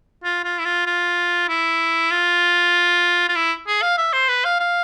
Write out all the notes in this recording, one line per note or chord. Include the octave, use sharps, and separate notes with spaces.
F4
F4
E4
F4
F4
E4
F4
F4
E4
G#4
F5
E5
C5
B4
F5
F5